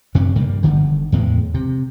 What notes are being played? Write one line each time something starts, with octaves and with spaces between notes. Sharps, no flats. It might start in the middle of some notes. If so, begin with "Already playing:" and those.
F#2 C3 C#4 D4
G2 G3 A#3
G1 D3 D#3
E2 A2 G#3
C3